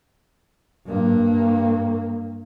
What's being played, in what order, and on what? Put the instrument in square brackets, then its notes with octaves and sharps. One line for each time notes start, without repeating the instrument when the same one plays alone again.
[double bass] G2 A#3